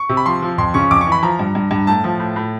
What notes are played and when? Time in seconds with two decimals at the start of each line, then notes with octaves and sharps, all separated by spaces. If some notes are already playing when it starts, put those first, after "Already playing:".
Already playing: C#6
0.09 C3
0.17 B5
0.26 F3 C6
0.43 F3
0.58 F2 C6
0.74 C#3 C#6
0.91 F2 D6
1.01 C#6
1.07 E3
1.12 B5
1.23 F3 A#5
1.39 G2
1.55 G2
1.71 G2
1.87 A2 A5
2.04 F3
2.20 A2
2.36 A2